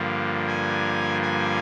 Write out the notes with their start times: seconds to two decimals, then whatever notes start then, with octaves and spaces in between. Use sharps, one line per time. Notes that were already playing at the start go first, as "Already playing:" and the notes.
Already playing: G2 D3 F3 A#3
0.47 G#5
1.22 G#5